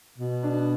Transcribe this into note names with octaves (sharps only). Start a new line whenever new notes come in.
B2
D4